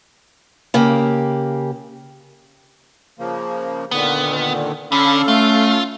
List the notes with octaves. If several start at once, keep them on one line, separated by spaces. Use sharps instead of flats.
C#3 A#3 G4
C#3 F3 A#3
A#2 D3 D#3 B3
D3 C#4 A4 F5 B5
A3 F4